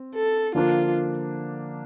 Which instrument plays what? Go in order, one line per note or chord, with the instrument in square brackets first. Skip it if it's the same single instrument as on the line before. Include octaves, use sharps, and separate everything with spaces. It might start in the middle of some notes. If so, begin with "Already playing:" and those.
Already playing: [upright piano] C4
[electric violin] A4
[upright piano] D3 F3 A#3 D4 [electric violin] F4